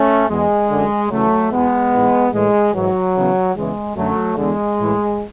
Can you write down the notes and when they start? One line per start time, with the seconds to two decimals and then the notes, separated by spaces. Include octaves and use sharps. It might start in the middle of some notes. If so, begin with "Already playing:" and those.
Already playing: A3 C#4
0.28 E2 B2 G#3
0.70 F#2 D3
1.10 F#2 C#3 E3 F#3 A3
1.52 E2 B2 G#3 B3
1.93 G#2 E3
2.32 A2 E3 G#3
2.74 G#2 E3 F#3
3.15 E2 C#3 E3
3.56 E2 C#3 E3 G#3
3.96 F#2 D3 F#3 A3
4.37 E2 D3 G#3
4.79 A2 E3